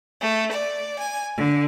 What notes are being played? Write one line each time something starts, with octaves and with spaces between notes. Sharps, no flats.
A3
D5
G#5
D3